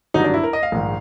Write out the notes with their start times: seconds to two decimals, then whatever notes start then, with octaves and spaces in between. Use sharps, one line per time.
0.14 G#1 G2 D3 F#3 D#4
0.24 D4
0.34 E4
0.43 A#4
0.53 D#5
0.63 F5
0.72 A#1 G#2 D#3